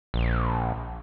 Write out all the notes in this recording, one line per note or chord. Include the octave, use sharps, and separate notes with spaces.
A#1